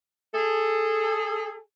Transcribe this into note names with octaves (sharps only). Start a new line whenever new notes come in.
G#4 A4